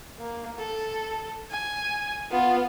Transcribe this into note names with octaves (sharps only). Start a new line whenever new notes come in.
A#3
A4
G#5
B3 F4